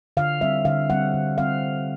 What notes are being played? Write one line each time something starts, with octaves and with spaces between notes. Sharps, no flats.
D3 F5
G3 C4 E5
D3 F5
G3 C4 F#5
D3
G3 C4 F5